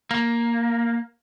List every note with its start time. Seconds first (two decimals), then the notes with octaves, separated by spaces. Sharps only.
0.11 A#3